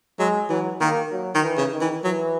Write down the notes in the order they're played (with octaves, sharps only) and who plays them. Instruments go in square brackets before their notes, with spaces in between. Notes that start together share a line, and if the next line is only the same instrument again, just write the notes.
[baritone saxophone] F#3 [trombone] G#3
[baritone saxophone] E3 [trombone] F#3
[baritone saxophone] D#3 [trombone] A#3
[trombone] F#3
[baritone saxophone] D#3
[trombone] E3
[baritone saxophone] C#3
[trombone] D#3
[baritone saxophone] E3
[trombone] E3 [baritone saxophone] F#3